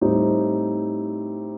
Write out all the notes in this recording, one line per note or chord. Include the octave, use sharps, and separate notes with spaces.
A2 G3 C4 D#4